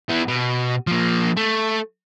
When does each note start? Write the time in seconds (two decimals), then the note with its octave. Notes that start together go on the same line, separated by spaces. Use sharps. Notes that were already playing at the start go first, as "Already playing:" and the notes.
0.09 E3 B3
0.28 B2
0.87 F3 A#3
1.37 A3